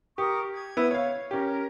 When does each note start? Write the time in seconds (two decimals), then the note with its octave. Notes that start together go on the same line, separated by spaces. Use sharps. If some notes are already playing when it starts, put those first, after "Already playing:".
0.18 G4 A#4 C#6 D#6
0.54 G#6
0.77 B3 E4
0.91 C#5 F5
1.31 C#4 G4 A#4